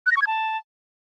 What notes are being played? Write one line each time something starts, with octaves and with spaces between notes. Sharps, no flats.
F#6
A#6
C#6
G#6
A5